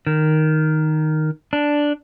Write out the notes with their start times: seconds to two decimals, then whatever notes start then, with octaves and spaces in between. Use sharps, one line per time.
0.06 D#3
1.53 D4